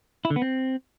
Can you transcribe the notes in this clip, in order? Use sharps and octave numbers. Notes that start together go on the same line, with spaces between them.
E4
D3
B3
C4